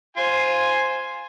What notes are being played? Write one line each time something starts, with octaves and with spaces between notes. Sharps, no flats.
F4 C5 G#5